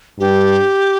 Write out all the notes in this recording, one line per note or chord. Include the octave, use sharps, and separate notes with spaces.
G2 G4